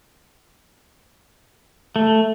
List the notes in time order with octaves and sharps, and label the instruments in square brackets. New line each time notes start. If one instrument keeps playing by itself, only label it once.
[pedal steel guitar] A3